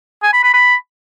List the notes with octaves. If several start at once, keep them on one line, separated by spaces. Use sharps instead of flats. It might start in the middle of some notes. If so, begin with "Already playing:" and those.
G#5
B5
B5
B5